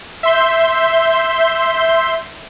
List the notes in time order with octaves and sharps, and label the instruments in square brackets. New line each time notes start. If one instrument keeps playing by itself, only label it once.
[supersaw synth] E5 C6 G6